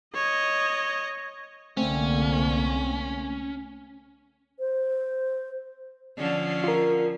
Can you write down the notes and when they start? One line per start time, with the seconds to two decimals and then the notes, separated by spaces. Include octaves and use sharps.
0.14 C#5 D#5
1.77 C2 D3 A3 A#3 C4 C#4
4.59 C5
6.17 D3 F3 C#4
6.64 F4 A#4